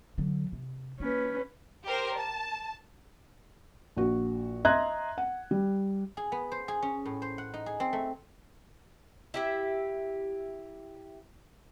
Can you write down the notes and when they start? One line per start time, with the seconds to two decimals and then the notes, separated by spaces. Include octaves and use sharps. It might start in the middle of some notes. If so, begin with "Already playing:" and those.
0.18 D3 F#3
0.53 C3
1.00 A#3 C#4 B4
1.85 G4 A#4 C5
2.16 A5
3.97 A#1 F#4
4.65 D#5 E5 A#5 C6 F#6 G#6
5.18 F#5
5.51 G3
6.17 G#4
6.32 B3
6.52 C5
6.68 G#4
6.82 C#4
7.05 A2
7.22 C5
7.38 F#5
7.54 D#4
7.66 G#4
7.80 C4
7.93 A3
9.34 E4 G4 E5